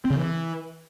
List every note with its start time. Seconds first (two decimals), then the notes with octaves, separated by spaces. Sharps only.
0.05 C4
0.10 C#3
0.16 E3